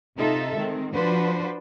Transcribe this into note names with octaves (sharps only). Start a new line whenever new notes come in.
C3 D#4 F4 A4 E5
D#3 G#3 C4
F3 D4 F#4 B4 C5